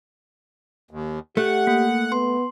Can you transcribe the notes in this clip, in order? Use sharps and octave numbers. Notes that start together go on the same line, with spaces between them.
D#2
A3 G4 F#5
A#3
B3 C6